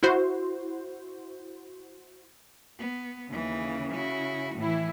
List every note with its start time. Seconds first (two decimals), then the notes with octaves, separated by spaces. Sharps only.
0.03 E4 F#4 C5
2.78 B3
3.29 D#2 C#3 E3
3.93 E4 F#4
4.55 A2 E3 E4